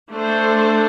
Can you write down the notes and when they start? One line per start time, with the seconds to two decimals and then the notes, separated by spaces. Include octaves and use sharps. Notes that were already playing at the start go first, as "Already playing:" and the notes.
0.10 A3 D4 A4 C5